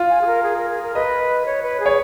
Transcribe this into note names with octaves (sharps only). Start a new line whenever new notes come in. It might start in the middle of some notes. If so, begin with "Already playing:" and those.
Already playing: F4
G#5
G#4
A#4
G#4
A#4
G#4
A#4
B4 D#5
C#5
B4
G#4
C#5